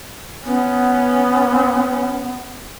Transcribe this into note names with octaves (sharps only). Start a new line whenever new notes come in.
B3 C#4